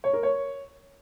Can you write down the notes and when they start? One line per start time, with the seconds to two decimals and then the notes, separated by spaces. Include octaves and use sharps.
0.04 C#5
0.13 A#4
0.23 C#5